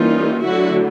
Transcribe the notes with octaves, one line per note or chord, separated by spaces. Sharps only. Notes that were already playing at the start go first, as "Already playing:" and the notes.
Already playing: E3 G3 A#3 C#4 D#4 F4
D3 F#3 A3 D4 E4 F#4